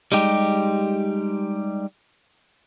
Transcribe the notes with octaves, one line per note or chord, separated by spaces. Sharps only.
G3 G#3 D#4 G4